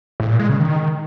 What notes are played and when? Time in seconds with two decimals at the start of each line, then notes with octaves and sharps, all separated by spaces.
0.20 A2
0.30 A#2
0.39 G#3
0.49 C#3
0.59 D#3